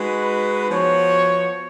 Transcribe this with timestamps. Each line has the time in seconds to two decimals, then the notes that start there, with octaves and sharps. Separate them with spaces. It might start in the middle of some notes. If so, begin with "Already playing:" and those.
Already playing: G#3 D#4 F#4 B4
0.69 F3 B3 F#4 C#5